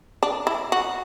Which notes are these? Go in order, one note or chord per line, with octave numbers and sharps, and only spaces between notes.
D4
E4
F#4